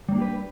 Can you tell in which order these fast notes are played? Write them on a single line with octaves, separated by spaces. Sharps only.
G3 A#3 D4 G4 B4